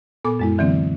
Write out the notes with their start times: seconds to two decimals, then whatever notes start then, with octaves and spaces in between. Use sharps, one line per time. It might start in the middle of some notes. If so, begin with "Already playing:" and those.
0.24 A#2 B3 A4 G#5 D6
0.40 F#2 G#3 E4
0.58 D3 E3 F#3 A#3 C4